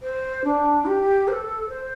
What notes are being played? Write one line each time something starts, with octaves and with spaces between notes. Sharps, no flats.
C5
D4
G4
C5
A4
C5